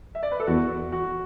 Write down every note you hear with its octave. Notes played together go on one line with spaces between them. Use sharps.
E5
D5
B4
A4
E2 F#4
F#4